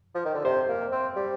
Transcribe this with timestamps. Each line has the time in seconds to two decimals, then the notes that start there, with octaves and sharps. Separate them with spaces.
0.15 F3
0.25 D#3
0.34 D3
0.44 C3 C5
0.69 A#3
0.91 C4
1.16 G3